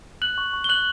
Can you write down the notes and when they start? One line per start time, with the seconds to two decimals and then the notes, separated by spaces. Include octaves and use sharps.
0.22 F#6 F#7
0.38 C#6
0.53 C#6
0.64 G7
0.69 F#6 F#7